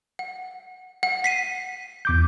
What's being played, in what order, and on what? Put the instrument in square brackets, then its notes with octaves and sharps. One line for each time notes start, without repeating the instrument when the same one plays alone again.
[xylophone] F#5
F#5
B6 C7 D#7
[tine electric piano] E2 D6 G6